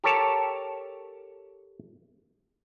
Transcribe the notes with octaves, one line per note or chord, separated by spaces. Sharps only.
G4 A4 A#4 C#5 A5